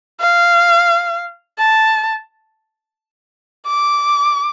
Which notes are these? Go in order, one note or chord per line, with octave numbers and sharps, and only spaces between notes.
F5
A5
D6